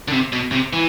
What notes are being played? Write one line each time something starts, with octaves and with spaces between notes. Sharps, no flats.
D3
C3
B2
C3
E3